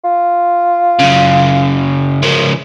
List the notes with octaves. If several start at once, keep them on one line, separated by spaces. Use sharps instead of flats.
F4
F#2 C#3
F#2 C#3 F3